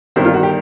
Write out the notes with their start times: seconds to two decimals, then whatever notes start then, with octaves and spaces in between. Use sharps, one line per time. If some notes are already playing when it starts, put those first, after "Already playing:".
0.16 G1 G2 D#3 C4
0.25 F4
0.34 F#4
0.43 G4